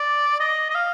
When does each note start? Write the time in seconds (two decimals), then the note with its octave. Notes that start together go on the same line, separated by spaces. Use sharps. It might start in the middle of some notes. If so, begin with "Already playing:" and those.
Already playing: D5
0.40 D#5
0.70 D#5
0.75 F5